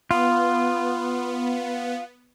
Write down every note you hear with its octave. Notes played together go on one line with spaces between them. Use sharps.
B3 F4